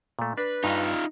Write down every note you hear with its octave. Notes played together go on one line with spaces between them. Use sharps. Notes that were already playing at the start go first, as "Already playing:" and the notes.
A#2 A3
D4 B4
G2 D#4 F4